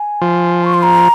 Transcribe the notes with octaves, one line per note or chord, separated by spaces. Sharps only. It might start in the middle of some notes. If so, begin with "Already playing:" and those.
Already playing: G#5
F3
C#6
C6
A#5